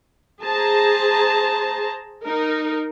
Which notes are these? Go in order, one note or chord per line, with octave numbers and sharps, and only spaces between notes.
G#4 C5 A5 A#5
D#4 A#4